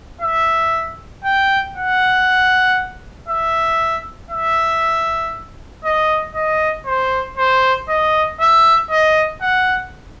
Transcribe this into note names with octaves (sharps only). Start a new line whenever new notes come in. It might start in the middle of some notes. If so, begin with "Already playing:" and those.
E5
G5
F#5
E5
E5
D#5
D#5
C5
C5
D#5
E5
D#5
F#5